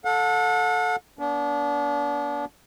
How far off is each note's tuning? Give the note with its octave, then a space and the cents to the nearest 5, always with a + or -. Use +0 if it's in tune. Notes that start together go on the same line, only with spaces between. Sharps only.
A4 +0 F#5 -40
B3 -45 D4 -30